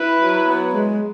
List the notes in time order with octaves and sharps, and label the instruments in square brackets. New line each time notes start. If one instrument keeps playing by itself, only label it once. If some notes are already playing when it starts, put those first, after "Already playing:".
Already playing: [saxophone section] E4 [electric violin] B4
[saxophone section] F#3
B3
G#3